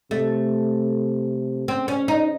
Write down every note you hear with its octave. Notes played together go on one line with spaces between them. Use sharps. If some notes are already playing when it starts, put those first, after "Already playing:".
C3 A3
C#3 C4
C#4
D#4